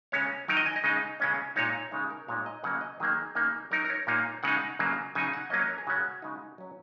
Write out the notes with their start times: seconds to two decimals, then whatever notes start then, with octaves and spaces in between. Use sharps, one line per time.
0.12 C#3 G#3 C#4 C#5
0.48 D#3 F#3 D#4 A#4
0.57 D#5
0.66 G#5
0.76 D#5
0.84 C#3 G#3 D#4
1.20 C#3 G#3 C#4
1.56 A#2 G#3 D#4 C#5
1.91 C#3 G#3 D#4
2.10 A#4
2.28 A#2 G#3 D#4 C#5
2.46 D#5
2.64 C#3 F#3 A#3 F#5
2.81 D#5
3.00 D#3 F#3 A#3 D#4 G#4
3.35 C#3 A#3 D#4
3.71 F#3 D#4 A#4
3.85 A#4
3.90 C#5
4.07 A#2 A#3 D#4
4.43 C#3 G#3 D#4 F#5
4.79 C#3 F#3 A#3
5.15 C#3 F#3 D#4 G#5
5.34 F#5
5.50 F#3 A#3 C#4 D#5
5.59 C#5
5.68 A#4
5.78 G#4
5.87 C#3 G#3 C#4 F#4
6.22 C#3 G#3 D#4
6.58 F#3 C#4